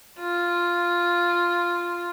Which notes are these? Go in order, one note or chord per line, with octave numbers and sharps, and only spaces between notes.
F4